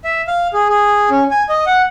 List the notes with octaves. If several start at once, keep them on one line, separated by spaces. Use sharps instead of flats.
E5
F5
G#4
G#4
C#4
G#5
D#5
F#5